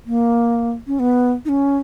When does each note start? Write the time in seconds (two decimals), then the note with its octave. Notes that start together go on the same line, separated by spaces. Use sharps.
0.06 A#3
0.87 C#4
0.99 B3
1.45 D#4
1.49 C#4